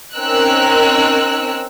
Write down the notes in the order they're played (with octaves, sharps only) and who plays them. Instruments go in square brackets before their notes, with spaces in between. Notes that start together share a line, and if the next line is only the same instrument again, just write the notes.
[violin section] C4 C#4 D#4 A#4 E6 F#6